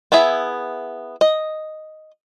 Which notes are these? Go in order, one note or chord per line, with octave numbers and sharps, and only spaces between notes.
B3 E4 G#4 E5
D#5